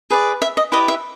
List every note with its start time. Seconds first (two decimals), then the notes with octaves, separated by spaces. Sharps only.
0.10 G#4 B4 D5
0.42 E5
0.57 D#5
0.72 E4 G4 B4 D5 D#5
0.88 E5